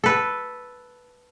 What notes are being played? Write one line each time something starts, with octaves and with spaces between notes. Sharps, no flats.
A4 B4